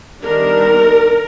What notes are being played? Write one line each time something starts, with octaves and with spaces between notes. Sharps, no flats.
D#3 G3 B3 D4 A#4